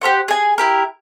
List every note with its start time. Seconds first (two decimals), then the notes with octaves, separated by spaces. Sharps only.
0.02 G4 A#4 C5 F#5
0.28 G#4 G#5
0.58 E4 G4 A#4